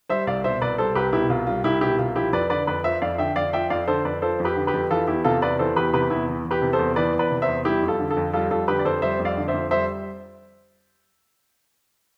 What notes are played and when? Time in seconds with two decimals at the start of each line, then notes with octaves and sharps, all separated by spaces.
0.09 G3 C5 E5
0.27 C2 D5 F5
0.44 B2 C5 E5
0.61 C2 B4 D5
0.78 G3 A4 C5
0.95 C2 G4 B4
1.13 B2 E4 G4
1.30 C2 F4
1.47 G3 F4
1.64 C2 E4 G4
1.81 B2 E4 G4
1.99 C2 F4
2.15 F3 E4 G4
2.33 F2 B4 D5
2.50 D3 B4 D5
2.67 F2 B4 D5
2.84 F3 C5 E5
3.02 F2 D5 F5
3.18 D3 E5 G5
3.36 F2 D5 F5
3.53 F3 E5 G5
3.70 F2 D5 F5
3.87 D3 A4 C5
4.05 F2 B4 D5
4.22 F3 A4 C5
4.40 F2
4.45 G4 B4
4.56 D3
4.67 G4 B4
4.74 F2
4.90 E3 F4 A4
5.07 E2 E4 G4
5.24 C3 F4 A4
5.42 E2 B4 D5
5.59 E3 A4 C5
5.76 E2 G4 B4
5.93 C3 G4 B4
6.10 E2 E4
6.28 E3
6.45 E2
6.51 G4 B4
6.62 C3
6.73 A4 C5
6.79 E2
6.96 E3 B4 D5
7.14 E2
7.19 B4 D5
7.31 C3
7.42 C5 E5
7.48 E2
7.65 G3 E4 G4
7.82 F2
7.88 F4 A4
7.99 D3
8.11 F4 A4
8.17 F2
8.33 G3 F4 A4
8.50 F2 F4 A4
8.68 D3 G4 B4
8.79 D5
8.85 F2 A4 C5
9.02 G3 C5 E5
9.20 F2
9.25 D5 F5
9.37 D3
9.48 C5 E5
9.54 F2
9.71 G3 C5 E5